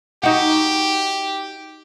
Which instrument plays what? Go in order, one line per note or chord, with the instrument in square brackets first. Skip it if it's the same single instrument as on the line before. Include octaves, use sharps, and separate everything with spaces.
[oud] D#4 F#4 [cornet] G4